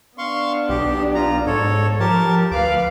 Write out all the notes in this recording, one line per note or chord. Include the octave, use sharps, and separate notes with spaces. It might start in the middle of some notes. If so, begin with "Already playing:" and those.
B3 D4 F5 C6 C#6
B1 G4
F4 A#5
G#2 A4 C#5
F3 G4 A#4 A5
D2 B4 F5 D6